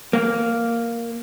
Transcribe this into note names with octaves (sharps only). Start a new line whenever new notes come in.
A#3